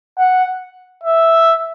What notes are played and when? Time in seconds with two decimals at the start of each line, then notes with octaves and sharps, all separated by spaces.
0.19 F#5
1.04 E5